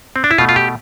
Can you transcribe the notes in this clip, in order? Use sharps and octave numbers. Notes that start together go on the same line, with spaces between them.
C4
D4
E4
B2 A3 F4
F4
G4